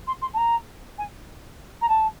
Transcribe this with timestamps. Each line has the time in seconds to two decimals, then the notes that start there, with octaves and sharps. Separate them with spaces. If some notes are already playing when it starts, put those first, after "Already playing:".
0.07 C6
0.22 C6
0.34 A5
0.37 A#5
0.98 G#5
1.82 A#5
1.89 A5